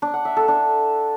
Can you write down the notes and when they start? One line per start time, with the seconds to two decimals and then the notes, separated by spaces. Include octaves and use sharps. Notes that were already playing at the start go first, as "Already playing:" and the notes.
0.02 D4
0.14 F#5
0.25 E5
0.37 A4
0.48 D4